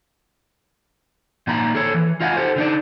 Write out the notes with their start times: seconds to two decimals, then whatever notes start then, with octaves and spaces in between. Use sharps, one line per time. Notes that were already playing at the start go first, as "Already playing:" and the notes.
1.47 A#2 D#3 A#3 A#5 B5
1.75 G#4 A4 C#5
1.94 E3
2.20 F4 D#5 F5 F#5 G#5
2.37 G4 A4 C5
2.56 D3 D#4 D5